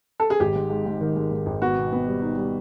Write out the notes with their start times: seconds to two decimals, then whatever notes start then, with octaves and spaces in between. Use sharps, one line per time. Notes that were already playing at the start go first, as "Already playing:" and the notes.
0.20 A4
0.30 G#4
0.40 G#1 G4
0.56 G#2
0.70 G#2
0.86 G#2
1.01 D#3
1.16 G#2
1.31 G#2
1.46 G#1
1.62 B3 F#4
1.77 B2
1.92 B3
2.07 G3
2.22 D#4
2.37 G3